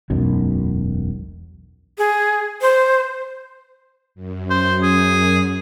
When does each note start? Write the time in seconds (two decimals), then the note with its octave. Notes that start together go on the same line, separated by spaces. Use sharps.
0.10 E1 B1 F#2
1.98 G#4
2.62 C5
4.15 F#2
4.50 C5
4.83 G#4